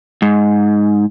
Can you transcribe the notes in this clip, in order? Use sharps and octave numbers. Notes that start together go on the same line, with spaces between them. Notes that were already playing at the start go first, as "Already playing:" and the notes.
G#2